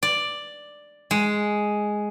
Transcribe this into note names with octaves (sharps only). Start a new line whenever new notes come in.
D5
G#3